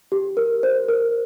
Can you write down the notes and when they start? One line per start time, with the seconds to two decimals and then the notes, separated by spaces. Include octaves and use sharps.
0.12 G4
0.37 A#4
0.63 C5
0.88 A#4